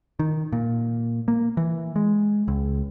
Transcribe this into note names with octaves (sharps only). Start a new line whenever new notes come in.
D#3
A#2
A#3
E3
G#3
C#2